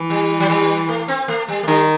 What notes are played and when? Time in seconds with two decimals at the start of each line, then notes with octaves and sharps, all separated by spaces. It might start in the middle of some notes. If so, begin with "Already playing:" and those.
Already playing: E3
0.10 G3
0.40 F#3
0.49 G3
0.88 A3
1.08 C4
1.28 A3
1.48 G3
1.63 A3
1.68 D#3 G3